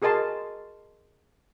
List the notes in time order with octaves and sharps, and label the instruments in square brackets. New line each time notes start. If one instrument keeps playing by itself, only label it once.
[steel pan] F#4 G#4 A#4 D#5 A5 C6